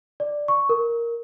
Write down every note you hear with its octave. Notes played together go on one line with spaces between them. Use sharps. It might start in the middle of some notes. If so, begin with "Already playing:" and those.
D5
C#6
A#4